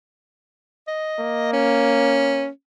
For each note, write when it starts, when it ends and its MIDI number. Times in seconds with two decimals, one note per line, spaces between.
0.88 1.53 75
1.19 2.50 58
1.53 2.48 61